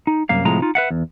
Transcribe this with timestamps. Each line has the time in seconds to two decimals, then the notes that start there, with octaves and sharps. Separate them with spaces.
0.07 D#4
0.29 C2 F#2 A#3 F5
0.45 A2 C3 F3 G#3 A#5
0.62 D#4 F4
0.75 B4 E5 F#5
0.91 E2